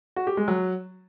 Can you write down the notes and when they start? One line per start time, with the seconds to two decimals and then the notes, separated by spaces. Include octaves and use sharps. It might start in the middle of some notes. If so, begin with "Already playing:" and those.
0.16 F#4
0.27 G4
0.37 G#3
0.48 F#3